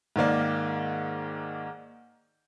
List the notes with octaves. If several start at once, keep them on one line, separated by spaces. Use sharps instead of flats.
G#2 D#3 A#3 D5